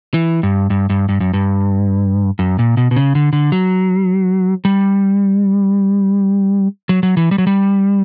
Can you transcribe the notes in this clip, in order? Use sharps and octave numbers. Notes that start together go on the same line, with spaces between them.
E3
G2
G2
G2
G2
F#2
G2
F#2
A#2
B2
B2
C#3
D3
D3
F#3
G3
F#3
F#3
E3
G3
F#3
G3